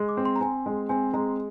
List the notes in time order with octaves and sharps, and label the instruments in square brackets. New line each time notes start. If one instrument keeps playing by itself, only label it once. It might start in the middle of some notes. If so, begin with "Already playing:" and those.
Already playing: [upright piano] G#3
[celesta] D6
[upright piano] C4
[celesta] C6
A#5
[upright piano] C4 [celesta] G#5
[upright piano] G#3
[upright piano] C4 [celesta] G#5
[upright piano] G#3 [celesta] A#5